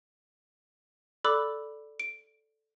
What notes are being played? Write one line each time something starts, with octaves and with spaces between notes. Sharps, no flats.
A4 D5 B5 D6 E6 F#6
D7